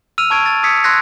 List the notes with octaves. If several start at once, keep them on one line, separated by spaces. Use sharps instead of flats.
E6 F6 D#7 F7
A5 C#6 G#6 D7 D#7
A6
D#6 E6 G#6 B6 C#7
C6 E6 F#6 G#6 A#6 C7